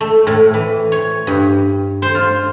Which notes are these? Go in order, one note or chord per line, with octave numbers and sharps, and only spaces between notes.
A3
A2
E3
C#5
G2
C5
F4